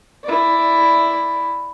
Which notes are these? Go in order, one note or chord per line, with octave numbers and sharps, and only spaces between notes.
E4 D5